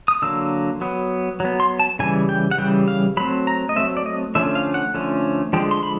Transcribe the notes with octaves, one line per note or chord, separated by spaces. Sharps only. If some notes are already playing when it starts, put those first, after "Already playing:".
D#6
D3 F#3 A#3 E6
F#3 B3
F#3 B3
C6
A5
C#3 E3 G3 G#5
G5
F#5
C#3 E3 G3 G5
F5
F#3 A3 C4 B5
A#5
D#5
F#3 A3 C4 E5
D5
D#5
D3 F3 A3 C#4 E5
F5
F#5
D3 F3 A3 C#4
D3 F3 G#3 G5
C6
B5